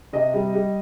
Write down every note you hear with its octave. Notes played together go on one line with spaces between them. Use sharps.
C3 D#5
G3
G3